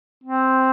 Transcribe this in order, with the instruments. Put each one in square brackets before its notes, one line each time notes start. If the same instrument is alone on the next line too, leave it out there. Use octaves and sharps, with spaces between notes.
[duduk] C4